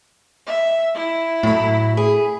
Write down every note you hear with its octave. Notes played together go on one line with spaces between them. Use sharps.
E5
E4
A2 F#3 B5
G#4